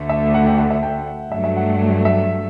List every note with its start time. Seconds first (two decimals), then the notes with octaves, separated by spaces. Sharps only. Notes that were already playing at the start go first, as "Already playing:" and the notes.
Already playing: D2 D3 A3
0.09 E5
0.34 F#5
0.46 G5
0.58 F#5
0.71 E5
0.83 G5
1.32 G2 F#3 A3 E5
1.44 E5
1.57 F#5
2.05 E5